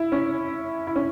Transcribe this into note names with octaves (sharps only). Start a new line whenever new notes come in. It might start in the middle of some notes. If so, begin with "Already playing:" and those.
Already playing: E4
C#4
E4
C#4